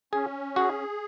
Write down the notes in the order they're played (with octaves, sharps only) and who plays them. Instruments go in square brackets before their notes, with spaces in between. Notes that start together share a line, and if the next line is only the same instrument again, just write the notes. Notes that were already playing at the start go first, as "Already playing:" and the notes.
[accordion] C#4 [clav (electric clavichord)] G#4
[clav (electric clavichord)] F#4 [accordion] G#4